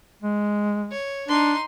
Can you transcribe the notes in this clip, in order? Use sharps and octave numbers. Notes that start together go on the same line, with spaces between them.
G#3
C#5
D4 D#4 C6